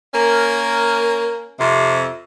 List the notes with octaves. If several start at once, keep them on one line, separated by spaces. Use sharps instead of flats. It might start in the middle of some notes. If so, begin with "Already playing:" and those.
A#3 C#4 A#4
F2 C3